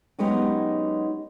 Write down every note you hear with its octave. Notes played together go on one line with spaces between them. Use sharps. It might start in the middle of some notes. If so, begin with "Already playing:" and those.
F#3 G#3 B3 C#4 D#4 G4